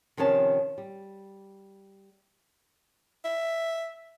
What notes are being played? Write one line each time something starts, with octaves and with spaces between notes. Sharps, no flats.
C3 D#3 F3 C#4 A5
G3
E5